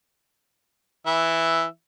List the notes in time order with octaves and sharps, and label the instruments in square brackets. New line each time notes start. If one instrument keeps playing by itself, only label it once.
[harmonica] E3 E5